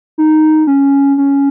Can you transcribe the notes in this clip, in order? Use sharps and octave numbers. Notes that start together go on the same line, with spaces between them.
D#4
C#4
C#4